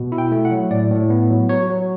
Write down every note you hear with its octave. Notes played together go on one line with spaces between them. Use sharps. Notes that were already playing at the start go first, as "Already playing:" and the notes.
Already playing: B2
E4
G5
A3
F#5
F#3
A2 D5
A2
B3
F#3
F#3 C#5
F#3